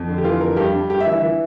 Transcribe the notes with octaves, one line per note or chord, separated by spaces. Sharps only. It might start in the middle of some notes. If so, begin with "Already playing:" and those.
Already playing: F2
D3
G4
E3 F4
F2 A#4
G2 G4
G2
G2 G4
E5
E3
E5
E3